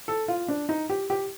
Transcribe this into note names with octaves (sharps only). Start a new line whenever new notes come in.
A4
F4
D4
D#4
G4
G4